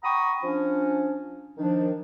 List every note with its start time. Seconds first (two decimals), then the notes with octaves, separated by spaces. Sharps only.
0.04 F#5 G5 A#5 B5 C#6 D#6
0.43 F3 C#4 D4
1.57 D#3 F3 D4